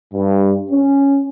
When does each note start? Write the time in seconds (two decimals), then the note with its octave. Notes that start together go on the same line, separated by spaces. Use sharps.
0.14 G2
0.71 C#4